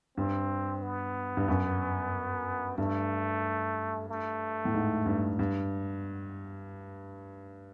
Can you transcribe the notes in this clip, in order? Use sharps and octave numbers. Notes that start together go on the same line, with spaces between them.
G2 C4
B3
G2
F#2
G2 A3
A3
A2
G#2
G2
G2